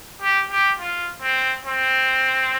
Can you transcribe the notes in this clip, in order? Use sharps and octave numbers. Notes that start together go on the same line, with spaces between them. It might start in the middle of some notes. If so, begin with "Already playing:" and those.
G4
G4
F4
C4
C4